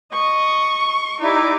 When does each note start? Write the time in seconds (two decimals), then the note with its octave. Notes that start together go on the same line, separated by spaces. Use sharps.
0.13 D#5 C#6
1.21 D#4 E4 G4 D5 D6